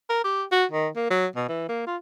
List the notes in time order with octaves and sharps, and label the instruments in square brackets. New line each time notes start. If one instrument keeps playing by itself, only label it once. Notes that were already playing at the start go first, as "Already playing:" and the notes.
[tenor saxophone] A#4
G4
F#4
D#3
A#3
F#3
B2
E3
A#3
F4